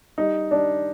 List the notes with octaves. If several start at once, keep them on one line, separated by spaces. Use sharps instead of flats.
G3 D#4
G3 D4